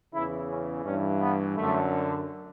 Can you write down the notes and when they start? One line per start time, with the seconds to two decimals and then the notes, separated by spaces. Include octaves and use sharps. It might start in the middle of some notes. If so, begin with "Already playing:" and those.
0.13 E2 C#3 E3 E4
0.49 C#4
0.85 G2 E3 C#4
1.20 B3
1.56 F#2 D3 A3